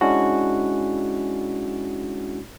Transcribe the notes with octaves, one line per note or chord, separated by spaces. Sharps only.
G#3 C#4 D4 E4 F#4